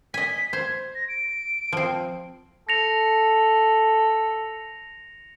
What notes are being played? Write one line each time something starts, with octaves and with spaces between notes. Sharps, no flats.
D#5 G#5 B6
C5 G#6
A#6
D7
F3 C4
A4 A#6 C#7 F7